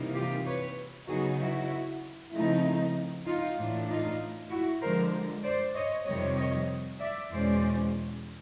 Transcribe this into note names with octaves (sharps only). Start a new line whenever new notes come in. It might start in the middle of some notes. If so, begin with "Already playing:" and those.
Already playing: C3 E3 G3 A#3 D#4
F4 G4
B4 C#5
C#3 F#3 B3 D#4 F#4 G#4
E4 F#4
C#3 F3 A3 C4 D#4 E4
D#4 F4
A2 E3 A3 D4
D#4 F4
E4 F#4
D3 F3 G#3 A#4 C5
C5 D5
C#5 D#5
F2 C3 D#3 G3 C4 C#5 D#5
C#5 D#5
D5 E5
E2 B2 G#3 C#4 C5 D5